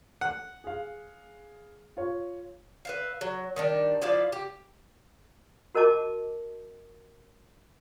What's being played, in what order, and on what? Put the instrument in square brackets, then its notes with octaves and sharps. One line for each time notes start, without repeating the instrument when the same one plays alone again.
[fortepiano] F#5
[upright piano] G#4 F5
F4 C#5
[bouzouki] B4 E5 F5
F#3
D#3 G3 D4
F3 E4 D5 F5
G4
[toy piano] F#4 A#4 D#5 A5 D6